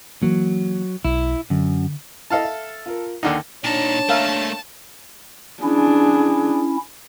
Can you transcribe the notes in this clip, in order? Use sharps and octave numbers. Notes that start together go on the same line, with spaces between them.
E3 F#3 A#3
B1 E4
F#2 D3
E4 A4 D#5 F5 A5
E5
F4 A#4
D#2 D3 D#4 F#5 G5
A#2 D4 D#4 C#5 A5
A3 A#3 A#4 E5 F5
C#4 D4 E4 G#4